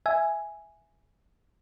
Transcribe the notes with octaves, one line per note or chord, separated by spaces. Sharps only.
E5 G#5